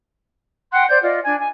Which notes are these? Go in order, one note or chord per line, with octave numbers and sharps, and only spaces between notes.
F#5 G5 C6 F#6
C5 D5 G6
F4 D5 D#5
D4 G#5 G#6
G#5